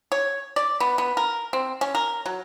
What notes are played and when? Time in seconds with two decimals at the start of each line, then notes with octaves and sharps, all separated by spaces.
0.12 C#5
0.56 D5
0.80 B3
0.98 B3
1.17 A#4
1.53 C4
1.81 C#4
1.95 A#4
2.26 F#3